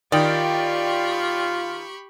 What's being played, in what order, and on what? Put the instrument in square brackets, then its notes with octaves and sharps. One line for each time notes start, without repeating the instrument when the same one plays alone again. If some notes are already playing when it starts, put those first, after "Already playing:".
[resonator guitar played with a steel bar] D#3 [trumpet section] F4 [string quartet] G4 B5 C#6 [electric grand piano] D5 G5